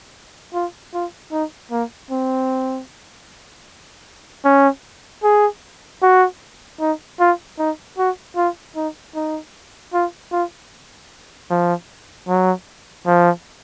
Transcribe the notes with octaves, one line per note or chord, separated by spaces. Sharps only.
F4
F4
D#4
A#3
C4
C#4
G#4
F#4
D#4
F4
D#4
F#4
F4
D#4
D#4
F4
F4
F3
F#3
F3